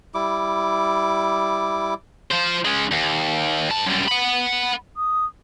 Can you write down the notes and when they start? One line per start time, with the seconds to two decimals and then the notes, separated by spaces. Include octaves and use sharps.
0.14 G3 E4 D6
2.32 F3 C5
2.65 G#3 C#4
2.92 D#2
3.70 G2 A5
3.87 F#2 G3
4.09 F#5 B5
4.97 D#6